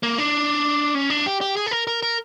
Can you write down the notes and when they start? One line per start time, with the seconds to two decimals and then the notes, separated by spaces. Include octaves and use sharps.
0.03 A#3
0.18 D4
0.95 C#4
1.10 D4
1.26 G4
1.41 G4
1.57 G#4
1.67 A4
1.71 A#4
1.87 A#4
2.02 A#4